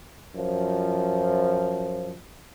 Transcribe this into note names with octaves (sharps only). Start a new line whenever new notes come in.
F#2 F3